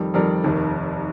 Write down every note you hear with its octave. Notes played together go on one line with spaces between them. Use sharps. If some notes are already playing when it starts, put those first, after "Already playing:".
Already playing: F2 D#3 G3
F2 D#3 G3 A#4 D5
F1 D#2 D#3